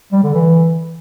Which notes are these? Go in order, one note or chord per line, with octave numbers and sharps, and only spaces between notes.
G3
D3
E3